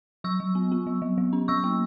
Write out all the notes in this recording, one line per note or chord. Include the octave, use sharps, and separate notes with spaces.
F#3 C#6 E6
F#3
B3
B3
F#3
F#3
F#3
C#4
F#3 C#6 E6
A#3